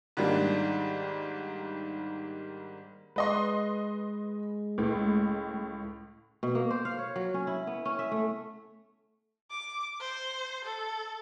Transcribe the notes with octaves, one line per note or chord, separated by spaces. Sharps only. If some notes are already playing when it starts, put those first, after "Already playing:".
G#2 D#3 G3 A#3 D4
G#3 B4 D#5 C6
C#2 A2
B2
A#3
C5
F5
C#5
F#3
C#4
E4
B3
C#4
E5
A3
D6
C5
A4